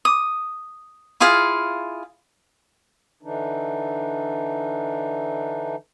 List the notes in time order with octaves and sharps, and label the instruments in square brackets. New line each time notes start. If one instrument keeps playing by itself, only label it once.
[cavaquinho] D#6
E4 F4 G#4 F5
[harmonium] D3 E3 D4 D#4